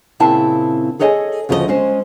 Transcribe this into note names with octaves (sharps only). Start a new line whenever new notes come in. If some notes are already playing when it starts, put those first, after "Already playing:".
A#2 C#3 C4 E4 G5 A5
G#4 A4 C#5 D#5 F#5 G#5
D2 C#3 F3 C#4 B4 D#5
G#3 C#4 C5